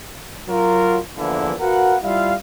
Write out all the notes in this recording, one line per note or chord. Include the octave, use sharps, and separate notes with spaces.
F#3 F4 A#4
E2 D3 E3 F3 A#3 E4
F#4 A#4 B4 F5 F#5
G3 E4 F4 F5